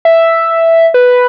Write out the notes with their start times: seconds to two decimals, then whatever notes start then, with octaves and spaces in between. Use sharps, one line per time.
0.05 E5
0.94 B4